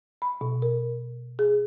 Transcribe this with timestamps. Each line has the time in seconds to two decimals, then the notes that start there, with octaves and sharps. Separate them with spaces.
0.22 B5
0.41 B2
0.62 A#4
1.39 G#4